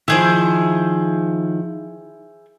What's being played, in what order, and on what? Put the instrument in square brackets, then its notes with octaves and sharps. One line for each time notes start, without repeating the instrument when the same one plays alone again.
[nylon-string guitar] D#3 F3 [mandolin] E4 G#4 C5